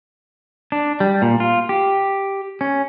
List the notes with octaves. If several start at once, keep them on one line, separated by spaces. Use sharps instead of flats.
D4
G3
A#2
F4
G4
C#4